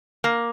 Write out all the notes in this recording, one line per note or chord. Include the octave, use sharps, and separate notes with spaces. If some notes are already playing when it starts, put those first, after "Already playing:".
A#3